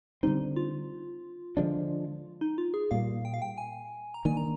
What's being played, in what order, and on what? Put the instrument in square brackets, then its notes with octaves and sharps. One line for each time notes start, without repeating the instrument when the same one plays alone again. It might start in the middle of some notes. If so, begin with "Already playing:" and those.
[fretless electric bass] D3 G3 C4 [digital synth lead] D#4
[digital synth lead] F4
[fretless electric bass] D3 F3 G#3 D4
[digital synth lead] D#4
F4
G#4
[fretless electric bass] A#2 G3 A#3 [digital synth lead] F5
[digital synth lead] G5
F5
G5
G#5
A#5
[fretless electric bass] D#3 A#3 D4 [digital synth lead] G#5
[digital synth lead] A#5